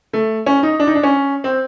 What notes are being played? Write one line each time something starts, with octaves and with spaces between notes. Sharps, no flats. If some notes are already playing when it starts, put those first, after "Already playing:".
A3
C#4
D#4
D4
D#4
D4
C#4
C4